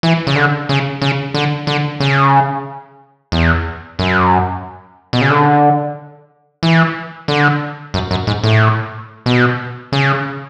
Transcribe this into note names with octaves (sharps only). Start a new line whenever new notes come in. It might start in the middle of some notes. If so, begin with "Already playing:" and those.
E3
C#3
D3
C#3
C#3
D3
D3
C#3
E2
F#2
B2
C#3
D3
E3
D3
F#2
F#2
G#2
A2
B2
C#3